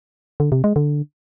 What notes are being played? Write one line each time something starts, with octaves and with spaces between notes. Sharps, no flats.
D3
C3
G#3
D3